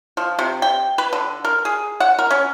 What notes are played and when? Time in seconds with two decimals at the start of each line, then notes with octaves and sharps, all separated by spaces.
0.17 F3
0.39 C3
0.62 G5
0.98 B4
1.13 D3
1.45 A#4
1.65 G#4
2.00 F#5
2.19 A#4
2.31 C#4